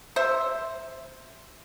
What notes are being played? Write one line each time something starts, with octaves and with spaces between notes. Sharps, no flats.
C5 E5